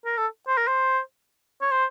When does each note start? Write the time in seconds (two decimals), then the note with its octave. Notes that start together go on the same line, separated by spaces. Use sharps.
0.05 A#4
0.17 A4
0.48 C5
0.58 A#4
0.68 C5
1.62 C#5
1.71 C5